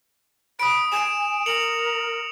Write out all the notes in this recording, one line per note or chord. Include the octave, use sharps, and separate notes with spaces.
B5 D#6 D7
G#5 D7 E7
A#4 C#7 F7 F#7